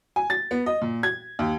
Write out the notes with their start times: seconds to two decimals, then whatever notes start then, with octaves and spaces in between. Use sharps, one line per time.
0.16 G#5
0.30 A6
0.51 B3
0.66 D#5
0.81 A#2
1.03 G#6
1.39 D#2